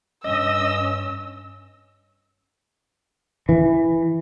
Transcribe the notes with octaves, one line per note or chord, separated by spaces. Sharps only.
G2 C#4 D#5 E6
E3